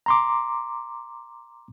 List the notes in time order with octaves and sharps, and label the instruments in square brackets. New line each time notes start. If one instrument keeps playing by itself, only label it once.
[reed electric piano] A#5 C6 D6